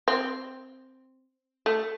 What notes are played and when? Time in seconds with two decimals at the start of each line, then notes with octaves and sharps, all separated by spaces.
0.08 C4
1.66 A3